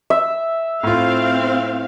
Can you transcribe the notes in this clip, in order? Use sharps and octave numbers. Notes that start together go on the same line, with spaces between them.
E5
A2 C4 F4 F5